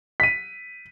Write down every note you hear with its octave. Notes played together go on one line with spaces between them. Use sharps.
B6 D#7